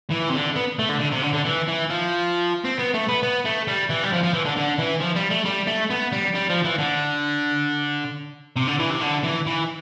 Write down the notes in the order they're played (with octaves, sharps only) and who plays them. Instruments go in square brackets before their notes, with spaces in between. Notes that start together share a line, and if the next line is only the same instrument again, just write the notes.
[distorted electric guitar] E3
C3
D3
B3
A3
D3
D3
C3
D3
D3
E3
E3
F3
C4
B3
A3
B3
B3
A3
G3
E3
G3
F3
F3
E3
D3
D3
E3
F3
G3
A3
G3
A3
B3
G3
G3
F3
E3
D3
C3
D3
E3
C3
D3
E3
E3